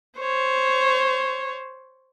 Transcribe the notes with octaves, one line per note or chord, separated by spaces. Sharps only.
C5 C#5